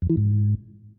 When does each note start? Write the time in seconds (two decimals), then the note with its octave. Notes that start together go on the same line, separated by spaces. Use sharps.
0.02 F2
0.10 E3
0.17 G#2